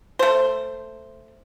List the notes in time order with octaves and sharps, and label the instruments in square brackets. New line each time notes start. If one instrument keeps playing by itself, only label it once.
[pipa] A3 C5